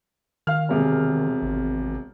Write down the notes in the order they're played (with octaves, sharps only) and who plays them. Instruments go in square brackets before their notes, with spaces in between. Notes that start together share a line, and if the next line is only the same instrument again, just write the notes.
[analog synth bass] D#3 [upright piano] F5 F6
[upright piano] E1 C3 G#4
[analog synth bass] G#1